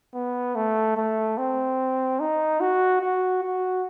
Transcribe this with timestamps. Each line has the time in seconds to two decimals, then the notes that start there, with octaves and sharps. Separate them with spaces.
0.14 B3
0.55 A3
0.97 A3
1.38 C4
2.20 D#4
2.61 F#4
3.01 F#4
3.43 F#4